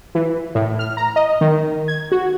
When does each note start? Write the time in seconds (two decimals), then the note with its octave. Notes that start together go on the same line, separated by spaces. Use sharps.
0.15 E3
0.55 A2
0.79 F6
0.97 A#5
1.16 D#5
1.41 D#3
1.88 G#6
2.12 F#4